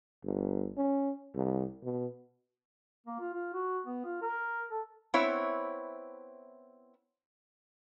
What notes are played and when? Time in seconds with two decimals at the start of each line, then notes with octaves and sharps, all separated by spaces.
0.24 G1
0.77 C#4
1.35 C2
1.84 B2
3.07 A#3
3.20 F4
3.34 F4
3.54 F#4
3.87 B3
4.05 F4
4.22 A#4
4.71 A4
5.14 B3 C4 E4 C#5 E5